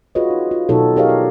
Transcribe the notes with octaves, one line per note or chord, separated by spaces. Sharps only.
F4 F#4 G#4 B4 C#5 D#5
D#4
F4
B2 F#3 D#4 F#4 A4 C#5
G4 G#4 A#4 C#5 D#5 F5
D5